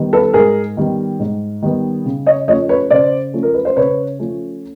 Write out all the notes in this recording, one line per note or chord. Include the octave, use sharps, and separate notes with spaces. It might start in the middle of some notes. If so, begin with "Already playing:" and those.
Already playing: D#3 G3 B3
A4 B4
G#2 G#4 A#4
D#3 G3 B3
G#2
D#3 G3 B3
C#3
C#5 D#5
F3 A3 C#4 C#5 D#5
B4 C#5
C#3 C5 D5
F3 A3 C#4
A#4
B4
C5
C#3 B4 C#5
F3 A3 C#4